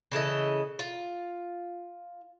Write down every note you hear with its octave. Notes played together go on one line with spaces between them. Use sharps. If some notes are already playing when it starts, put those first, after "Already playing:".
C#3 E3 A4 D#5
F4